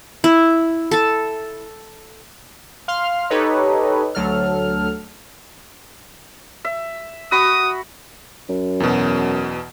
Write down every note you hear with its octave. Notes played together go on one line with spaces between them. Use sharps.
E4
A4 A5
F5 C6 F6
D#4 G4 A4 B4 C#5 D#5
D2 F#3 A4 F6
E5
F#4 B5 D#6
F#2
E2 B2